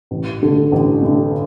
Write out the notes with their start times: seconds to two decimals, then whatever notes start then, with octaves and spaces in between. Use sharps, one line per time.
0.11 A1
0.42 G2 D3 A3
0.72 A1
1.02 G2 D3 A3